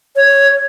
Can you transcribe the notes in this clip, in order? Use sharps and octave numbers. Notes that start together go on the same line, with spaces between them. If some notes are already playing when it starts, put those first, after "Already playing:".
C#5